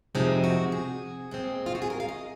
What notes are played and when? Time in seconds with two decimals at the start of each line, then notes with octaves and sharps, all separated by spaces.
0.15 F2 C3 F3 G#3 C4 D#4
0.44 F#4
0.72 G#4
1.31 A#2 G#3 C4
1.66 F4
1.75 F#4
1.82 G#4
1.90 A#4
2.00 F5
2.09 D#5